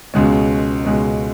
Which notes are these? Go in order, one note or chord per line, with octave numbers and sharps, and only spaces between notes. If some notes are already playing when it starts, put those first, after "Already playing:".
C#2 B2 G#3 C#4
C#2 B2 G#3 C#4